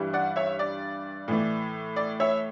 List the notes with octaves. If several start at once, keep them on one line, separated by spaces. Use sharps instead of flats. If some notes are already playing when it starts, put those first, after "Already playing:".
Already playing: G2 E3 G3
D5 F#5
C#5 E5
D5
A2 E3 A3
D5
C#5 E5